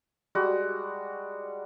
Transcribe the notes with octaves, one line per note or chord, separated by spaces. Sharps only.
G3 G#3 F#4